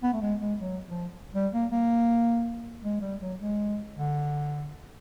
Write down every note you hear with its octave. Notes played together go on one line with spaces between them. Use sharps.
B3
A3
G#3
G#3
F#3
F3
G3
A#3
A#3
G#3
G3
F#3
G#3
D3